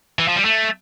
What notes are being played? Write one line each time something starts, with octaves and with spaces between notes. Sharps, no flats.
E3
F3
G3
A3